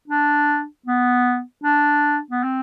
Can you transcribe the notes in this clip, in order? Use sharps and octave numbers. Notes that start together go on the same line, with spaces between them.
D4
B3
D4
B3
C4